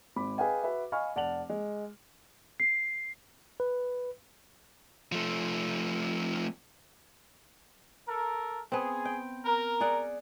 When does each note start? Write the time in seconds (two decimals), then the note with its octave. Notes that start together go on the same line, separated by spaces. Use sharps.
0.16 G#1 B5 D6
0.38 G#4 B4 D#5 F5 G5 G#5
0.63 F#4 B4 E5
0.92 D#5 F5 G#5 B5 C#6 F6
1.16 F1 D5 F#5 A5 F7 F#7
1.50 G#3
2.60 C7
3.60 B4
5.12 F3 A3
8.08 A4 A#4
8.72 B3 C4 G#4
9.05 G5
9.45 A#4
9.80 G#4 D5 F#5